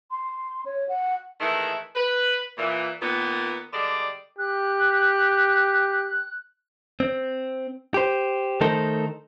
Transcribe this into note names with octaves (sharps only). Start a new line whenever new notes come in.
C6
C#5
F#5
D#3 E3 G#3 A3 E4
B4
A#2 E3
A#2 D#3 B3
D3 G3 G#3 D5
G4 F#6
C4
G4 C5
D#3 A3 D#4 A4 A#4 C5